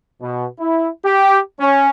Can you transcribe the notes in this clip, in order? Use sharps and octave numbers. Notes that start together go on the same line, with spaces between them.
B2
E4
G4
C#4